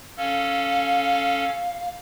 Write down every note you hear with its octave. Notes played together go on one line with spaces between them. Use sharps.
C#4 A4 F5